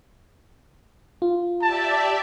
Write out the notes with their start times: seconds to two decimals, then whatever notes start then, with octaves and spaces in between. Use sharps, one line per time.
1.22 F4
1.62 G4 D5 E5 A5